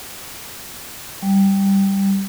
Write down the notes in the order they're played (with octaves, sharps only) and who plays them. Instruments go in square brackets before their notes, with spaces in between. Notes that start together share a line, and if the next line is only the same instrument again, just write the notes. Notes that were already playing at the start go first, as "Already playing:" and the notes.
[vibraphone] G3